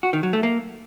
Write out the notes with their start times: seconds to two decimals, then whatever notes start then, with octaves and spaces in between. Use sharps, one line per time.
0.03 F#4
0.13 D#3
0.23 F#3
0.33 A3
0.43 A#3